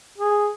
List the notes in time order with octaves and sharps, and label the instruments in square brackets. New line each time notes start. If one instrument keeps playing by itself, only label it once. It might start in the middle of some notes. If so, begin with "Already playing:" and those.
[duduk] G#4